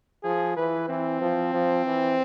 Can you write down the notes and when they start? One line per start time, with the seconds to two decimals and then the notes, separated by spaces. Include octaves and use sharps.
0.24 F3 G#4
0.57 E3 B4
0.88 E3 C4
1.21 F3
1.53 F3
1.86 E3